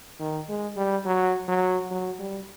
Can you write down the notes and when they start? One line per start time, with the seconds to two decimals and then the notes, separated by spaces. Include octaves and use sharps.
0.20 D#3
0.49 G#3
0.77 G3
1.05 F#3
1.48 F#3
1.91 F#3
2.20 G3